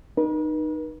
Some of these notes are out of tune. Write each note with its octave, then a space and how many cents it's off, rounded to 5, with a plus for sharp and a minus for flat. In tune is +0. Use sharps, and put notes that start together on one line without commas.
D#4 -20 B4 -45